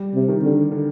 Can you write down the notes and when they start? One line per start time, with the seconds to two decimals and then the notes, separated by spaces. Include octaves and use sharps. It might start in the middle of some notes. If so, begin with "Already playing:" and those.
Already playing: G3
0.15 C3
0.28 D#3
0.43 D3
0.72 D3